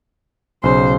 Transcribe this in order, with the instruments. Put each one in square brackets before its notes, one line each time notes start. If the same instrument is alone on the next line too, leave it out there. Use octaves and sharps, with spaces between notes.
[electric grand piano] B1 C#3 [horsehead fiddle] C5